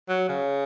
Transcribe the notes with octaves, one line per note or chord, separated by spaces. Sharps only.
F#3
C#3